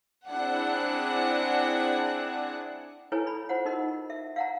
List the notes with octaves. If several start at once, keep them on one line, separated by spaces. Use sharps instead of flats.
C4 D4 E4 G#4 F#5
E4 A4 B4 C#5 G#5
B5
F4 C5 F#5
D#4 F#4 A#4 D#5
E5
F5 F#5 A#5